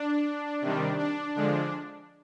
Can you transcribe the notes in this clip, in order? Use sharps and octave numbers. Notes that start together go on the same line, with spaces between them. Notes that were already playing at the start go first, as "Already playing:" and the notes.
Already playing: D4
C3 D#3 G3
D4
D3 F3 G#3 D4